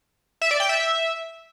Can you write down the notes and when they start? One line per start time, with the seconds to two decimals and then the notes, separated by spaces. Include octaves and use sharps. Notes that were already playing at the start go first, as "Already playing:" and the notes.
0.42 E5
0.51 D5
0.60 G5
0.69 E5